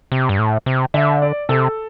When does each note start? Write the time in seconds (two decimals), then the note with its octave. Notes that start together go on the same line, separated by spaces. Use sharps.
0.12 C3
0.29 G2
0.39 A2
0.66 C3
0.94 D3 E5
1.22 D5
1.49 C3 A4